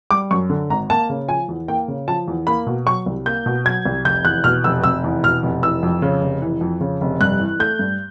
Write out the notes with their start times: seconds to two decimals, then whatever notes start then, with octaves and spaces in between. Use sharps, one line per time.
0.11 G3 D6
0.31 F#2 C#6
0.50 D3
0.70 G#1 A#5
0.90 A#3 A5
1.10 C#3
1.28 F3 G#5
1.49 E2
1.68 A#3 G5
1.88 C#3
2.08 F3 A5
2.28 E2
2.47 A#3 B5
2.67 B2
2.86 F#3 C#6
3.06 C2
3.26 A#3 G6
3.46 B2
3.65 F#3 G#6
3.86 C2
4.05 F1 G6
4.25 E2 F#6
4.44 B2 F6
4.64 F1 E6
4.84 F1 E6
5.04 E2
5.23 B2 F6
5.43 F1
5.63 E3 E6
5.83 F2
6.02 C#3
6.21 F1
6.42 E3
6.61 F2
6.81 C#3
7.01 F1
7.21 G2 F#6
7.40 E3
7.59 A3 G6
7.79 G2